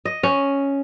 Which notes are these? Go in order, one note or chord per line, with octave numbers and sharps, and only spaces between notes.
D#5
C#4